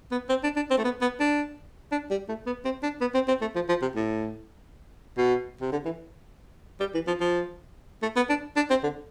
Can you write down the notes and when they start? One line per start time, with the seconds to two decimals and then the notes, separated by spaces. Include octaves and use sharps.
0.11 B3
0.29 C4
0.43 D4
0.56 D4
0.70 C4
0.78 A3
0.84 B3
1.01 B3
1.20 D4
1.92 D4
2.11 G3
2.28 A3
2.46 B3
2.65 C4
2.83 D4
3.01 B3
3.14 C4
3.28 C4
3.41 A3
3.55 F3
3.69 F3
3.82 C3
3.95 A2
5.18 B2
5.61 C3
5.72 D3
5.85 E3
6.80 G3
6.94 E3
7.07 F3
7.20 F3
8.02 A3
8.16 B3
8.29 D4
8.56 D4
8.70 C4
8.83 D3